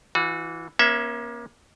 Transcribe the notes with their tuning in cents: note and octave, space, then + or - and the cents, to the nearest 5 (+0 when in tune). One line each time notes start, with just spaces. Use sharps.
E3 +0 F#4 -35
A#3 +30 C#4 -25 E5 +0